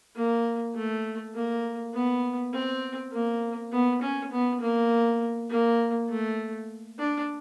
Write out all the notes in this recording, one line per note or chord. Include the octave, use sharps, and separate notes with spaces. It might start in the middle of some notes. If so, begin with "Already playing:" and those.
A#3
A3
A#3
B3
C4
A#3
B3
C#4
B3
A#3
A#3
A3
D4